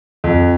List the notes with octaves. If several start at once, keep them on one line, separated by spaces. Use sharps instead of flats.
F2